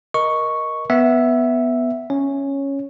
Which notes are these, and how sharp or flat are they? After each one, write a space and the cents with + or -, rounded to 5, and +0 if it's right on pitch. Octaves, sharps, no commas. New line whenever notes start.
A#4 +15 D#5 +0 C#6 +0
B3 +0 E5 +0
C#4 -5 C#5 +0